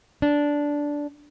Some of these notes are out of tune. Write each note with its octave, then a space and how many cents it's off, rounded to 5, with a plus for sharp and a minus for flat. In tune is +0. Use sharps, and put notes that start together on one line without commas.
D4 -10